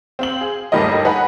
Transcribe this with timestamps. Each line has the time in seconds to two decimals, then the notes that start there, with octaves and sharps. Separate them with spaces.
0.19 C4 F5 F#7
0.41 G#4
0.72 G1 D#2 G3 A3 A#4 D#5
1.05 D#4 B4 F#5 G#5